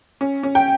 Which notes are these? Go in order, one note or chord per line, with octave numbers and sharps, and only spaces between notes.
C#4
C#4
G5